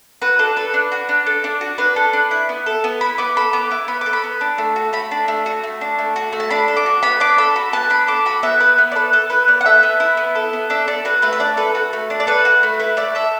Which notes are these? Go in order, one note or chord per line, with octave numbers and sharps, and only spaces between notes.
F#4 B4
D4 A4
A4 B4
D4
F#4
D4
A4
D4
F#4
D4 B4
A4
D4
E4
B3
A4
B3
E4 B5
B3 D6
A4 B5
B3 D6
E4 D6
B3 B5
A4 D6
B5
B3
D4
A3
F#4
A3 B5
D4
A3
F#4
A3
D4
A3
F#4
A3
A5
D4 B5
A4
D6
F#4
B3 B5
D4 D6
A4 B5
F#4 B5
B3 A5
D4 B5
A4 D6
F#4 B5
B3 E5
E4 B4
B3
D5
A4 B4
B3 A4
E4 B4
B3 D5
F#5
A4 E5
B3
E4
B3
A4
B3
D4 E5
A4 D5
F#4 B4
A3 B4
E5
D4 D5
A4 B4
F#4
A3
D4
D5
A4 B4
F#4
A3
E4 B4
A3 D5
A4 E5